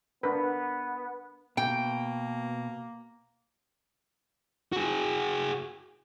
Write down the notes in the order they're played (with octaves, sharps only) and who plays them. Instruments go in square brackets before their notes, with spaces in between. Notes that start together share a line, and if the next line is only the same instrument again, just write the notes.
[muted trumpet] B3 [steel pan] D4 A#4 B4
[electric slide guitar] B2 [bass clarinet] A#3 [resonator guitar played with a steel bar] G5
[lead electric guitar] F#4 G#4